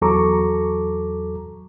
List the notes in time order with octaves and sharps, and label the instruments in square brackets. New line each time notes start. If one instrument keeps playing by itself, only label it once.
[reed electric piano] E2 F#3 A4 A#5 C#6 D6